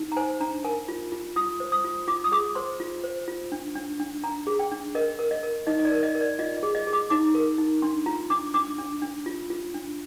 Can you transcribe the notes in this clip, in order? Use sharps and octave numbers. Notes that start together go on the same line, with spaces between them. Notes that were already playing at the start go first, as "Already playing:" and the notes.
Already playing: D#4
A#5
C5 G#5
D4 A#5
A#4 G#5
F4
F4
F4 D#6
C5
D#6
F4
F4 D6
D#6
G#4 D6
C5 C6
F4
C5
F4
D4
D4
D4
D4 A#5
G#4
G5
D4
A#4 D#5
A#4
D#5
A#4
D#4 D#5
D#5
D5
A#4
D#5
A#4
D5
F4 D#5
D#5
G#4
D#5
G#4
D6
D#4 D6
A#4
D#4
D4 C6
F4 A#5
D4 D6
D4 D6
D4
D4
F4
F4
D4